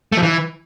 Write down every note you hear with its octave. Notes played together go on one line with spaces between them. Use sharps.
A3
F3
E3